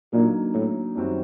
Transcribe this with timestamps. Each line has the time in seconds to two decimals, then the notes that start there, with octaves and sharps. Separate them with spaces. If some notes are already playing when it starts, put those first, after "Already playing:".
0.12 A#2 D3 F#3 A#3 D#4
0.54 A2
0.95 F#2 D#3 G3 C4 F#4